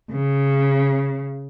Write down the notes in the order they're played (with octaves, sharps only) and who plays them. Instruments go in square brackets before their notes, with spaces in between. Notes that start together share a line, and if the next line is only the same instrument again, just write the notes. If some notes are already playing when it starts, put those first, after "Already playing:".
[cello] C#3